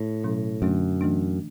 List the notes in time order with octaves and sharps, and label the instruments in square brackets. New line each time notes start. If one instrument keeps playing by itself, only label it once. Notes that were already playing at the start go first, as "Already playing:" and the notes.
Already playing: [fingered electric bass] A2
[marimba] B2 F#3 C#4 E4
[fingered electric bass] F#2 [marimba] D3 A3 D4
[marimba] E3 A3 D4